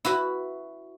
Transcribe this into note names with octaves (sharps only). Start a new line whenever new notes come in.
E4 F#4 B4